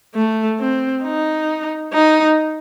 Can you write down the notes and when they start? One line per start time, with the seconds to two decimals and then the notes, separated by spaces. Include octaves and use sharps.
0.15 A3
0.59 C4
1.03 D#4
1.92 D#4